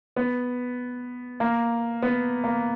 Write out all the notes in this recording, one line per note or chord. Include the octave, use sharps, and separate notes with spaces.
B3
A#3
B3
A#3